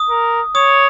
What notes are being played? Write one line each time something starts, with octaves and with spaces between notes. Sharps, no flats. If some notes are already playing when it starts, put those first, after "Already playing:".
Already playing: D#6
A#4
C#5 D#6